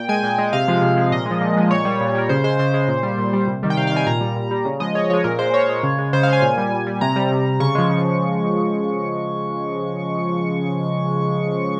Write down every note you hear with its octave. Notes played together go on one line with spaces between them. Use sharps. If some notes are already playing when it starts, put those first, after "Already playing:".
Already playing: A#2 G5
G#3 G#5
A#2 G5
G#3 D#5
C3 F5
F3 G#3
C3
F3 G#3
A#2 D#5
F3 G#3
A#2
F3 G#3
A#2 C#5
G3
A#2
G3 A#4
C#3 C5
G#3 C5
C#3 C5
G#3
A#2
G3
A#2
G3
C3
D#3 G3
G5
C3 F5
F5
D#3 G3 G#5
A#2 A#5
G3
A#2
G3
C#3
F3 G#3 D#5
C#3 C#5
F3 G#3 C#5
A#2 A#4
G#3 C5
A#2 C#5
G#3
C#3
G#3
C#3 C5
F5
G#3
G#5
A#2
G3
A#2
G3
C3 A#5
G3
C3
G3
C#3 C#6
F3 G#3
C#3